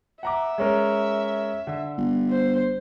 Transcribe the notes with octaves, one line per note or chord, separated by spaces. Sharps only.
E5 F#5 A#5 D6
G#3 C#4 A#4
D3
G1
C5